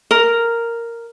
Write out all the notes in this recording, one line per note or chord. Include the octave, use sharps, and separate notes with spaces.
A#4